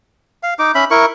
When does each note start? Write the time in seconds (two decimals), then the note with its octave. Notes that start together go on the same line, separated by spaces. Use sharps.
0.43 F5
0.59 D#4 D6
0.75 C#4 E5 B5
0.91 E4 A#4 C#6